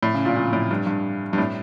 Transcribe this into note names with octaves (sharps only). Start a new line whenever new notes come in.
A2
C#3
A#2
A#2
A2
G2
G2
G2
A2